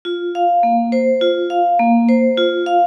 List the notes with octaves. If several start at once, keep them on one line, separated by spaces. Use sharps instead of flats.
F4
F5
A#3
C5
F4
F5
A#3
C5
F4
F5